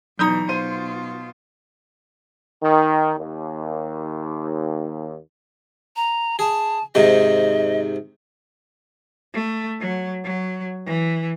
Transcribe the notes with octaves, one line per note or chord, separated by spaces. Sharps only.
B2 E3 F#3 D#4 A#5 D#6 G6 C#7
B2 F4 C5 D#7
D#3
D#2
A#5
G#4 A5
G#2 C3 D#3 D#5
A3
F#3
F#3
E3